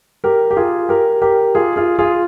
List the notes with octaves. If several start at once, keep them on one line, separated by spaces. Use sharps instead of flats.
G4 A#4
G4
F4 G#4
G4 A#4
G4 A#4
F4 G#4
F4 G#4
F4 G#4